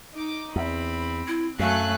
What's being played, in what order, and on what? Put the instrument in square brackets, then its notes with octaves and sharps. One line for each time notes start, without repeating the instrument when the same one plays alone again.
[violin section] D#4 D6
[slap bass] E2 [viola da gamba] C4 [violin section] B5
[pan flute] E4
[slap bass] F#2 [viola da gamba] F#3 A3 [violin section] A4 G#5 F#6 [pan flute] F5